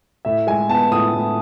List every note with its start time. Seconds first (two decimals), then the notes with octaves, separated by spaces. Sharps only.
0.25 A2 E5
0.47 G#3 G#5
0.69 B3 A5
0.91 A2 D#6
1.14 A2